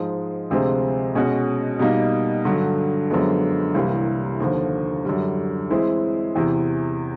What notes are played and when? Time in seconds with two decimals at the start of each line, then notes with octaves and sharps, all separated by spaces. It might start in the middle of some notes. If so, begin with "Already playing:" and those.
Already playing: G#2 F3 G#3
0.50 D2 C3 F3 G#3 C4
1.15 B2 G#3 C#4 F#4
1.79 B2 G3 A#3 D#4
2.45 G2 D3 F#3
3.10 F#2 D3 F3 G#3 B3
3.75 C2 C3 E3 G3 A#3
4.40 D#2 D3 F3
5.05 F#2 D3 G3
5.70 E3 G#3 C4 E4
6.35 E2 C3 E3